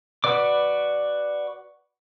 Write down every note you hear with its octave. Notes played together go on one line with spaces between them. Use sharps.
F#4 B4 D5 D6